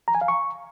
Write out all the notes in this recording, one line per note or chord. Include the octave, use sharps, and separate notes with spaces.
A#5
G#5
F5
C#6